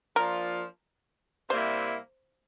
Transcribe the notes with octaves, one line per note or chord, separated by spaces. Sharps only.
F3 A#3 D4 F4 A#4
C3 G3 A#3 E4 C5